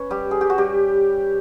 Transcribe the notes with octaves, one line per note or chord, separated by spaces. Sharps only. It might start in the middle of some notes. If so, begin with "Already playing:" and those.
Already playing: C#4 B4 C#5
G3 G4
G#4
G4
F#4
G3 G4